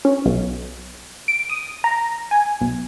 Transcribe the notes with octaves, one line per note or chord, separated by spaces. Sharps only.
C#4
B1
D7
D#6
A#5
G#5
B1